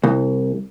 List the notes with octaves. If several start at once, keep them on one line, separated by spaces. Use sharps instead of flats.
C2